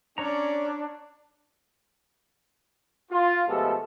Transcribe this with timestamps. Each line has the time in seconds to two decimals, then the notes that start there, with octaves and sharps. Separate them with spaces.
0.18 C#4 D4 C#5 D5 A#5
3.12 F4
3.48 B2 F3 G#3 A3 G4 A4